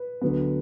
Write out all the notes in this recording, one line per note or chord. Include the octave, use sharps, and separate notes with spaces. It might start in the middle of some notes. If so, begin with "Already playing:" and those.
Already playing: B4
D2 D3 F#3 B3